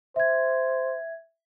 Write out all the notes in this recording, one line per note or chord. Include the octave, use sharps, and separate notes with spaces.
C5 E5 G#6